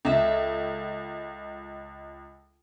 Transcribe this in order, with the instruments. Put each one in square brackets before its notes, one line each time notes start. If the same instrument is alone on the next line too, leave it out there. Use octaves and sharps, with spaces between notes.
[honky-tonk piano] C#2 [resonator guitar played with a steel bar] A4 E5